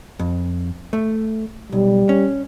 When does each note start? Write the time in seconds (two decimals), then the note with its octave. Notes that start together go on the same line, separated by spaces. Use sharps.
0.19 F2
0.93 A3
1.72 B1 G3
2.09 C#4